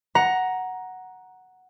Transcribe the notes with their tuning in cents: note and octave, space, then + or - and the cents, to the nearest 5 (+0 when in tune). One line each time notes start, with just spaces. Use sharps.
F#5 +0 A#5 +10